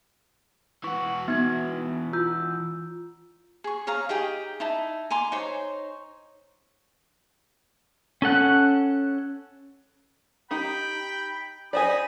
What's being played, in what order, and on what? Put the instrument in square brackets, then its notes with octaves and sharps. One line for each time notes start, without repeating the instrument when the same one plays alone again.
[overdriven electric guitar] E3 F#4 [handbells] C#6
[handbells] B3 D#4 G#6
F4 E6 G6
[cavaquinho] G#4 C#6
G#4 C#5 F5 A#5
D#4 G4 G#4 G5
D#4 E4 A5
G#5 A#5 C6 D6
D#4 C5 C#5
[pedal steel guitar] C#4 A4 F#5 F#6
[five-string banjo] D#4 G4 [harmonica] G5 B5
[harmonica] D#4 B5 D#6 [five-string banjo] G#4 C5 D5